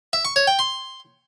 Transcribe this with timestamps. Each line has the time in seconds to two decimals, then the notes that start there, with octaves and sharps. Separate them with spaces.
0.13 E5
0.25 C#6
0.36 C#5
0.47 G5
0.59 C6